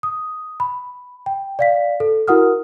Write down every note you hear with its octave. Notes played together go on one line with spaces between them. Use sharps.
D#6
B5
G5
D5 F5 B6
A4
E4 F#4 A#4 F#5 D#6 F6